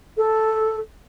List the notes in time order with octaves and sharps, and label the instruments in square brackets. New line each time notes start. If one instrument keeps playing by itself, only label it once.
[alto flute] A4